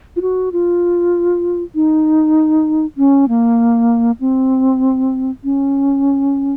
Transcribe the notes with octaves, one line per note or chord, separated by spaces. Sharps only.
F4
F#4
F4
D#4
C#4
A#3
C4
C#4